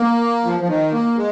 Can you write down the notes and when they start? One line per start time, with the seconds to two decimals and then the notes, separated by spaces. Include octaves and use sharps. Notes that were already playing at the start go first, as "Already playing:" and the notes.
Already playing: A#3
0.44 F3
0.61 F3
0.68 D#3
0.92 A#3
1.16 G#3